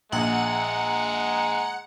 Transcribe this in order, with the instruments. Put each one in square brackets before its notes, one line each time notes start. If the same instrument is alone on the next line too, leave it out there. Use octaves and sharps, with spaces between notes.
[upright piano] A#1 [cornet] G#3 [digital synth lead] F#5 [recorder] A#5